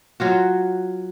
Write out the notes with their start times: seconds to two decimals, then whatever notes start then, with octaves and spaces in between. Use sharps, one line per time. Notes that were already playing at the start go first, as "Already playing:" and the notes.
0.20 F#3 F4 F#4